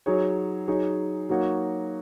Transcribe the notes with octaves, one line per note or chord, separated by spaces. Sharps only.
F#3 D#4 G#4 C#5
F#3 D#4 G#4 C#5
F#3 A#3 D#4 F#4 C#5